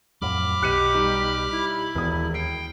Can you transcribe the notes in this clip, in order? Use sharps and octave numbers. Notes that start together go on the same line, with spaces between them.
F2 A2 F#3 B5 D6 F6
B1 B2 G4 F#6 C#7 D#7
G3 D#4
E4
E1 D#2 D#6
G5 C7